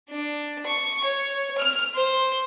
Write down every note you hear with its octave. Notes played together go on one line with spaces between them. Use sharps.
D4
C#6
C#5
F6
C5